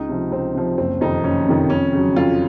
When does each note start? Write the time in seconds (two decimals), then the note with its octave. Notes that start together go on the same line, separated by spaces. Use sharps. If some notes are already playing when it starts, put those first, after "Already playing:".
Already playing: C#2 D#4
0.09 C3 F3
0.31 C#2 C4
0.55 C3 F3
0.78 F#1 C4
1.01 F2 C3 D#3 D#4
1.24 F#1 C#4
1.48 F2 C3 D#3
1.70 F2 C#4
1.93 C#3 F#3
2.16 F2 F4